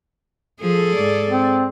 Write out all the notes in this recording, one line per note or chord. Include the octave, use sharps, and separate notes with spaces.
F3 G#4 A4
G#2 D5
C4